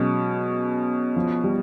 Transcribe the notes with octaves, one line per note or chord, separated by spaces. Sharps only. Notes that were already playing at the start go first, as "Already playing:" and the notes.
Already playing: B2 F#3 G#3 C#4
F3
G3